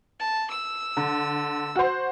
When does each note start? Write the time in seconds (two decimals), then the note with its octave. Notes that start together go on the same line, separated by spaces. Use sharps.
0.20 A5
0.51 E6
0.97 D3
1.76 F#4 C5